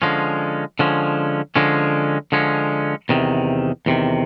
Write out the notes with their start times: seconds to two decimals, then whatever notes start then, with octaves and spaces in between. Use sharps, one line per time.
0.02 D3 F3 G#3 C#4
0.79 D3 F3 G#3 C#4
1.56 D3 F3 G#3 C#4
2.32 D3 F3 G#3 C#4
3.09 E2 C3 D#3
3.86 E2 C3 D#3